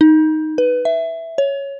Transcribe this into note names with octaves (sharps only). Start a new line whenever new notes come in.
D#4
B4
E5
C#5